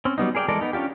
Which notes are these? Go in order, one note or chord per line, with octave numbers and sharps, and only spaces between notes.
C4 C#4
F#3 G3 B3 D#4
G#4 A#4 D5 E5 G5
E3 G#3 A4 A#4 D5
B3 D#4
C#4 D4 F4 G4